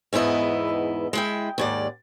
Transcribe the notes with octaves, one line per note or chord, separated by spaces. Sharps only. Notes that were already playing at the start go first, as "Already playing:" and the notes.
E2 G#2 B3 E4 D#5
G#3 E4 G5
D#2 G#2 D5